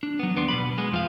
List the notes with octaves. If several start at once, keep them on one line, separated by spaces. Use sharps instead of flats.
D4
F#3 B3
D#2 B3 D4 C6
B2 B4 B5
G#3 B3
F2 F3 F5